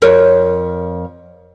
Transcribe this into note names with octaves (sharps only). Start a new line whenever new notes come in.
F2 A#4 C#5